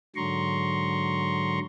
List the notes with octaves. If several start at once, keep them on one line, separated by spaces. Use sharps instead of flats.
G#2 D3 F#3 A#5 C6 C#6